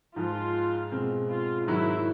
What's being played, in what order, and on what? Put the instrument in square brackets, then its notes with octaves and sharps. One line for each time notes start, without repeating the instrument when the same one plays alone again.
[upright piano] G#2 F3 G#3 [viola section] F4
[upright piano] B2 G#3 C4
[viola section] F4
[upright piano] G#2 D#3 F#3 [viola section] E4